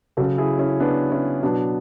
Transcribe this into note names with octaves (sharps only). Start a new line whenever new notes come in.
C#3 F#3 F#4 A4
E4 G#4
C#4 E4
B3 D4
C#4 E4
B2 F#3 B3 D4